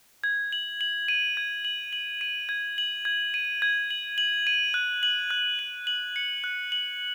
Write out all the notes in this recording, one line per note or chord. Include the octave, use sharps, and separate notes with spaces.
G#6
F#7
F#7
D#7
G#6
F#7
F#7
D#7
G#6
F#7
G#6
D#7
G#6
F#7
F#7
D#7
F#6
F#7
F#6
F#7
F#7
C#7
F#6
F#7